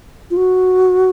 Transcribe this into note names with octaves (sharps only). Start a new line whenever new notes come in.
F4
F#4